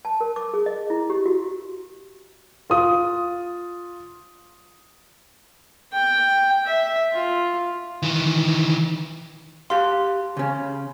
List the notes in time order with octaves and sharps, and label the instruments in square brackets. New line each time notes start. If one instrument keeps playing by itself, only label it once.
[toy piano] A5
A#4
D6
G#4
D#5
E4
G4
F#4
[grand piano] F4 D#6
[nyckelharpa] G5
E5
F4
[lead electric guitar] D#3 E3
[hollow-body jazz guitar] G4 F5 [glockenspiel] C6
[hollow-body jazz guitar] C#3 C#4